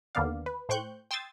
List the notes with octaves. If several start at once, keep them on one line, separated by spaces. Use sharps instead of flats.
D#2 D3 A#3 B3 D5 F5
B4
A2 C5 G5 C#6 F#6 G6
G5 C6 D#6 E6 G#6 A6